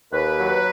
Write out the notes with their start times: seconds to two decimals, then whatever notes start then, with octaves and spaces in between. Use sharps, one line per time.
0.12 D#2 B4
0.38 F#3